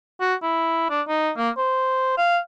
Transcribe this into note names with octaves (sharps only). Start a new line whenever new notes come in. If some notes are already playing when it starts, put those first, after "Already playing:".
F#4
E4
D4
D#4
A#3
C5
F5